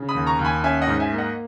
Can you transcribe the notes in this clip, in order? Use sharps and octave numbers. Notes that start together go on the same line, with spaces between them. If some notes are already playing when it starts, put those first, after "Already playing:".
Already playing: C#3
B5 D#6
D#2
A#5 C#6
D#2
G#5 B5
C#4 E5 G#5
D#5 F#5
G#2
E5 G#5
A#3
D#5 F#5